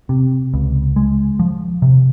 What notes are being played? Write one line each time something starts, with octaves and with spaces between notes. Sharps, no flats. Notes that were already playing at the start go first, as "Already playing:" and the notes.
C3
C#2
G#3
F3
C3